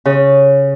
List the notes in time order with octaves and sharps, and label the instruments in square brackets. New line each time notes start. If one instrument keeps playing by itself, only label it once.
[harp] C#3